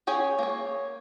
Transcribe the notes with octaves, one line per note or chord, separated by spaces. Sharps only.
C#4 G#4 C#5 G5
A#3 C#5